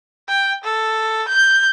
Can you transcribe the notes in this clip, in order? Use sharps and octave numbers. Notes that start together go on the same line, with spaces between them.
G5
A4
G6